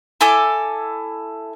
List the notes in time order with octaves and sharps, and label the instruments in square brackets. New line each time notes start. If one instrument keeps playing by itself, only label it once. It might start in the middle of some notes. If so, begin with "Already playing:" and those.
[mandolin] E4 A4 G#5 D6